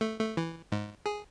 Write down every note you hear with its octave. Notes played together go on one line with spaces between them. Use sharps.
A3
A3
E3
G#2
G#4